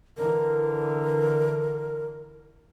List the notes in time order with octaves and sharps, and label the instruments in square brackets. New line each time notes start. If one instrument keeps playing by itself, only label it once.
[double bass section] D3 E3 [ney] A#4